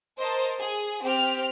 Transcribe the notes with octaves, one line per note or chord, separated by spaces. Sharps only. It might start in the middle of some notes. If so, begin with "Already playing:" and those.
A#4 C5 D#5 A5
G#4 G#5
C4 G4 F6